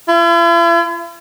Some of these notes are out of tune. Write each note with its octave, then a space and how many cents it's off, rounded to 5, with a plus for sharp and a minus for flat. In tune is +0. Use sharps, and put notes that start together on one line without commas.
E4 +45